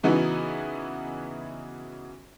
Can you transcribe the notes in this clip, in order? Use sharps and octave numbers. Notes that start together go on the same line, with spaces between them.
C#3 E3 B3 D#4 E4 F#4